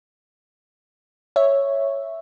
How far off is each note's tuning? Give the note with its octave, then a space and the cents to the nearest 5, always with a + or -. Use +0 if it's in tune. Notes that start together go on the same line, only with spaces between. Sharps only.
C#5 +0 E5 +0